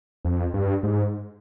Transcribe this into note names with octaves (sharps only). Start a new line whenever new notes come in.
F2
G2
G#2